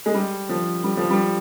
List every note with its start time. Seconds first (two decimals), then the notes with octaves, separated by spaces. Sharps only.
0.06 G#3
0.14 G3
0.49 F3
0.84 G3
0.97 F3
1.10 G3